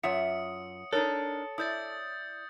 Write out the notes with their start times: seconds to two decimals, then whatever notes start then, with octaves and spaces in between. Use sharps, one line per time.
0.03 F#2 F4 C#5 E5 F#5 D#6 C#7
0.93 D4 D#4 A4 A#4 C#5
1.58 E4 D5 D#6 G6 A6